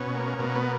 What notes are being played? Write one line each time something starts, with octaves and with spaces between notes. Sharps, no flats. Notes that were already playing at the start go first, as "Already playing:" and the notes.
Already playing: B2 C#4
A#3
B2 A#3
C#4
B3
A#3